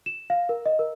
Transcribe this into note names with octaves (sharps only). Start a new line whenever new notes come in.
E7
F5
A#4
D#5
A#4